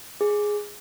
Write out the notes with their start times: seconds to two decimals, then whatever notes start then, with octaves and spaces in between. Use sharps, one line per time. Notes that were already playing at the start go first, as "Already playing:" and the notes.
0.21 G#4